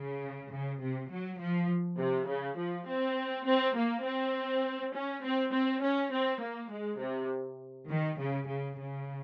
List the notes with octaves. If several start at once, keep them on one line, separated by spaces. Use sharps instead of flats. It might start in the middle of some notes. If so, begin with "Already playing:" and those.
Already playing: C#3
C#3
C3
F#3
F3
C3
C#3
F3
C4
C4
A#3
C4
C#4
C4
C4
C#4
C4
A#3
G#3
C3
D#3
C#3
C#3
C#3